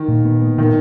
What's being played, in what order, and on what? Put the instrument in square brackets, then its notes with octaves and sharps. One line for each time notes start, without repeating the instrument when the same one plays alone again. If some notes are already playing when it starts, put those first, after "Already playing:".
Already playing: [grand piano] D#3
[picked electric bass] A#2
B3
B3
[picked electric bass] A#2 [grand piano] D#3